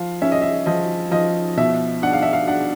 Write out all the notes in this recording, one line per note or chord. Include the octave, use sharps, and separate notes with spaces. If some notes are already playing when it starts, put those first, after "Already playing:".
Already playing: F3 F5
C#4 E5
D#5
E5
F3 D#5
F3 D#5
B2 E5
D4 F#5
F5
E5
F5
D4 F#5